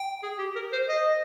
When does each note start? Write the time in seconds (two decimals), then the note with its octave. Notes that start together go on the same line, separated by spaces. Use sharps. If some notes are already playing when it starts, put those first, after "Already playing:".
Already playing: G5
0.23 G#4
0.39 G4
0.56 A#4
0.72 C5
0.89 D#5